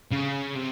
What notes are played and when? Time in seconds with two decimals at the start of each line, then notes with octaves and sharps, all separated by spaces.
0.11 C#3
0.55 C3